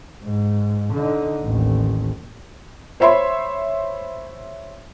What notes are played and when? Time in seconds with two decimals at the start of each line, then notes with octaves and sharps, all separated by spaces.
0.23 G#2
0.93 D3 D#4
1.42 A1 D#2
3.00 C5 C#5 E5 B5 C6